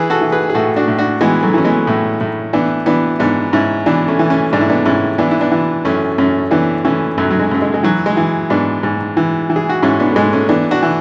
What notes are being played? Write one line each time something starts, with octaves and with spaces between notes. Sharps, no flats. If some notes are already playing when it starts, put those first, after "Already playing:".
Already playing: E3 G#4 B4
F#4 A4
E3
G#4 B4
G#4
A2 F#4 A4
D4 F#4
A2
D4 F#4
E3 G#3 B3
F#3 A3
E3 C#4
G#3 B3
A2
A2
E3 B3 D4
E3 B3 D4
G#2 B3 D4
G#2 C#4 E4
E3 B3 D4
A3 C#4
E3
A3 C#4
G#2 D4
E4
B3 D4
G#2 C#4 E4
E3 B3 D4
E4
B3 D4
E3
F#2 A3 C#4
F#2 A3 C#4
E3 B3 D4
E3 A3 C#4
F#2 F#3 A3
F#3
G#3
F#2 A3
G#3
G#3
E3 F#3
G#3
E3
G#2 B3 D4
G#2
E3
E3
G#4
F#4
G#2 C#4 E4
B3 D4
A3
G#2 G#3
A3 C#4
E3 B3 D4
D4 F#4
E3